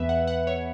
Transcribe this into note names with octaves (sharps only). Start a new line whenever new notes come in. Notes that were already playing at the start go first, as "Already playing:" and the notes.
Already playing: E2 E3 B3 B4 E5
F#5
F#5
C#5